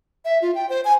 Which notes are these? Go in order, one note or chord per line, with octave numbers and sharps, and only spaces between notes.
E5
F4
G5
C5
G#5